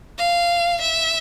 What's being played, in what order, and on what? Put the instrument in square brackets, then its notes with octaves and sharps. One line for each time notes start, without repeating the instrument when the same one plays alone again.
[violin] F5
E5